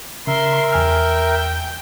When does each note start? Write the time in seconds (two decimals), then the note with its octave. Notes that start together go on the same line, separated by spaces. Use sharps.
0.27 C#3 A#4 E5 C6
0.72 E2 G5 G#5 F6